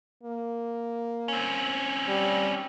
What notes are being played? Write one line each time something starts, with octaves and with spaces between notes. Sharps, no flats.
A#3
C4 C#4
G3